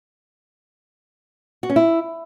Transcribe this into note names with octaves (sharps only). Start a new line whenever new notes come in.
F#4
C#4
E4